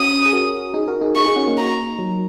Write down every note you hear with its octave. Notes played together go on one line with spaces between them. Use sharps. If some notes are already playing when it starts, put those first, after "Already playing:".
Already playing: C#4 F#4 D#6
G#4
F#4 A#4
D#4 G#4
F#4 A#4
D#4 G#4
D#4 G#4 C#6
D#4 G#4
C#4 F#4
A#3 D#4
A#5
F#3